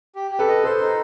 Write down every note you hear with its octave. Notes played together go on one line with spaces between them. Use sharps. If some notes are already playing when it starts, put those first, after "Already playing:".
G4
G4
A4 B4
D#5
A4 C5
D#4